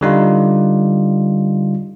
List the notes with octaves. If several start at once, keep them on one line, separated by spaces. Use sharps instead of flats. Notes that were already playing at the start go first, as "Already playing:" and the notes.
D3 G3 D#4 F4